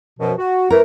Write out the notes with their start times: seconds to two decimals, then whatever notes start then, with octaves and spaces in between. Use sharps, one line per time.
0.20 F#2 B2 F3
0.38 F#4
0.70 E3 A3 A#4